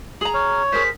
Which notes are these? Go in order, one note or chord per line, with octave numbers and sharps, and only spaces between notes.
G#4 A#5 F#7
C#5 F6
G#4 A#4 C5 B6